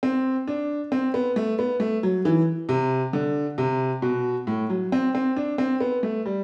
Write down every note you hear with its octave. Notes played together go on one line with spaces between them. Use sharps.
C4
D4
C4
B3
A3
B3
A3
F#3
E3
C3
D3
C3
B2
A2
F#3
C4
C4
D4
C4
B3
A3
G3